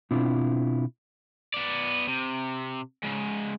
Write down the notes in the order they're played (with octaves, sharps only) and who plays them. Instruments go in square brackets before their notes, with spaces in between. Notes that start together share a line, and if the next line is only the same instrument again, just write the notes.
[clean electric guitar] B2 C4 D4 E4 F4
[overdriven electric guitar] B3 D5
C3
G#2 C#3